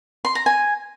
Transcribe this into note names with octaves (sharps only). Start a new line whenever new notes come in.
C6
A#5
G#5